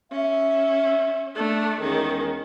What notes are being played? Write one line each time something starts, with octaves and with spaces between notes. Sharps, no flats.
C#4 E5
A3 D4
E2 D#3 G#3 C#4